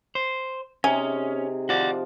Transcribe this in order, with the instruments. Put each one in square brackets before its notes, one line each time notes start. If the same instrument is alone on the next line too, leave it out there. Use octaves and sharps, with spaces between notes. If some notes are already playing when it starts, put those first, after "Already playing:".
[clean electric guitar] C5
[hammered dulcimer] C3 D#4 G#4 [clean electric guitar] C#4 [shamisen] G#5
[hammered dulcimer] F3 [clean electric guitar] F#4 D5